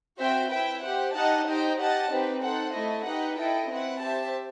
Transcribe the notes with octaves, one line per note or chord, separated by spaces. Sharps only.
C4 F#4 C5 E5 G5
E4 B4 E5 G5
G4 C5 F#5
D#4 G4 D#5 F#5 A5
D#4 G4 C5 D#5 G5
G4 D#5 F#5 A5
C4 D#4 G4 B4
D#4 A4 C5 F#5
A3 E4 A4 D#5
D#4 G4 B4 D#5 F#5
E4 A4 D#5 G5
C4 E4 B4 F#5
G4 C5 E5 A5